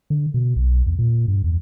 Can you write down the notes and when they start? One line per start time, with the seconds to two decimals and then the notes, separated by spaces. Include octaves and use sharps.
0.10 D3
0.34 B2
0.56 B1
0.86 E2
0.99 A#2
1.28 G2
1.44 E2